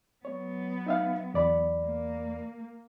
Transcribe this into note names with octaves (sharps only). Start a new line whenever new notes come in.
F#3 B3 C#5
D#4 E5 F5
E2 D5 B5
A#3